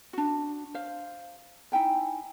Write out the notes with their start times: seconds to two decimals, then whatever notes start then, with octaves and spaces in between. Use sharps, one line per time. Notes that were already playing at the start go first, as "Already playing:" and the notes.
0.13 D4 F#4
0.74 C5 F5
1.72 D#4 E4 G5 G#5